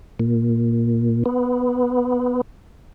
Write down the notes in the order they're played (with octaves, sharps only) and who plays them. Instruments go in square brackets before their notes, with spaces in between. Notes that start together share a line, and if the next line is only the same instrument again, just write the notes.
[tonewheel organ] A#2
B3